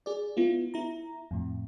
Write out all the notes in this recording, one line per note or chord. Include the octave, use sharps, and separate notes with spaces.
G#4 D5
B3 E4 F4
E4 A#5
F2 A2